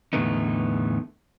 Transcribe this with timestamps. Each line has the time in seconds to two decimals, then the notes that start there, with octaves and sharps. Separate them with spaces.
0.13 E2 A2 D3 A3 B3 D#4